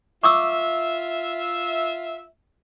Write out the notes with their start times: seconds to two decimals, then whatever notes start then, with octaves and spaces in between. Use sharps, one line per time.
0.24 F4 E5 C#6 D6 E6